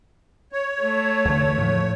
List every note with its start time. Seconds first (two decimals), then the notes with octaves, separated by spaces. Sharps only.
0.52 C#5
0.82 A3
1.26 E2 D3
1.58 A2 F3